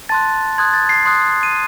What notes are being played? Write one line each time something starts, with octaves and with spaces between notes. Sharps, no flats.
A5 C6 F#6 A6
C6 D#6 F#6 G#6
A6
C7
C6 D#6 F#6
D#7